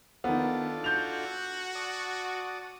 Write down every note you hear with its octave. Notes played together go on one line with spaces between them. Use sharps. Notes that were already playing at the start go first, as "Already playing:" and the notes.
D#3 B3 D4 F4 A4
F#4 G6 F7
D5 A5 D#6